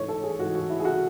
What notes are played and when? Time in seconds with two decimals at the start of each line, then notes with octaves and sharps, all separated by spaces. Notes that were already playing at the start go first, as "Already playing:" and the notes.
Already playing: G#2 E3 A3 C#5
0.08 A4
0.23 G#4
0.39 G#2 E3 A3 F#4
0.55 F#4
0.70 E4
0.80 G#4
0.85 F#4